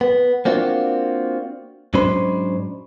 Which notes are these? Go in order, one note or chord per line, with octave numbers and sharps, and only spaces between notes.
B3
A#3 C4 D4 F4 F#4
G#2 F#3 C#4 D4 C5 B5